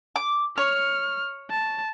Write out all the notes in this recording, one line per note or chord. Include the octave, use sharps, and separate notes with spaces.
D6
C#5 F6
A5